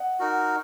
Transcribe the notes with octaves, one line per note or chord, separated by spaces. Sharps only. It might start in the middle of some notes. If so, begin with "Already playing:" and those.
Already playing: D#5 F#5
D#4 F#4 A#4